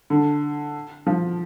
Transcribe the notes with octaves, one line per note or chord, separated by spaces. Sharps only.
D3
F3